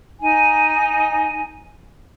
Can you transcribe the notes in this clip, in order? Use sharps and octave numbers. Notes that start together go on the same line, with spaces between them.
D#4 G#5